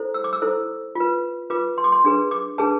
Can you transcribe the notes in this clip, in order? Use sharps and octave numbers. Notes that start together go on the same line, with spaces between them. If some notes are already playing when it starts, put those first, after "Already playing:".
Already playing: E4 A4 C5
E6
D6
E6
E4 A4 C5
F4 B4
F4 B4 D6
C6
D6
C6
D4 G#4 B4
D6
D4 G#4 B4 A5